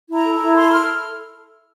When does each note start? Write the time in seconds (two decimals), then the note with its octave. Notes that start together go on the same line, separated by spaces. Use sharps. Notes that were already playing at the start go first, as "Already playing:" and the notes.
0.09 E4 A#5
0.25 A4
0.35 A#5
0.40 E4
0.55 A4 C6
0.72 A4 F6